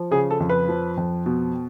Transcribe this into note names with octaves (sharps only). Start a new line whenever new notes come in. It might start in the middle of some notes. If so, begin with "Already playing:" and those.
Already playing: F3
C#3 G#4
A4
F2
B4
F3
F2
B2